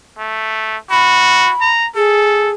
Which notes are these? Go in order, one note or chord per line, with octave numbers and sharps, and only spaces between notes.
A3
F#4 B5
A#5
G#4 A4